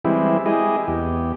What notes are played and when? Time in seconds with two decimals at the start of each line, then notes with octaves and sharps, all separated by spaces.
0.05 E3 G3 G#3 C4 E4
0.46 G#3 E4 G4 G#4 D#5
0.88 E2 G4